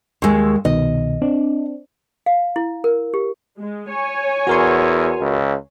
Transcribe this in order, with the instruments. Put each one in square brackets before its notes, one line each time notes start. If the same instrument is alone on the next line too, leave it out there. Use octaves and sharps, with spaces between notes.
[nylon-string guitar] D#2 G#3 [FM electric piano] C6 C#6 E6
[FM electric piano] C2 B2 D#3 [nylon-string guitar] D#5
[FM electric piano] C4 D4
[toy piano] F5
E4
A#4
G4
[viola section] G#3
C#5 G#5
[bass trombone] E2 [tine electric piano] F#4 A#4 C6
[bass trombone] C#2